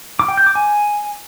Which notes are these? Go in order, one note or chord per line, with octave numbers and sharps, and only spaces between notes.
D6
G5
G6
D6
G#5